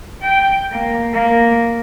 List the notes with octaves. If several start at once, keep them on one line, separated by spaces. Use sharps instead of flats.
G5
A#3
A#3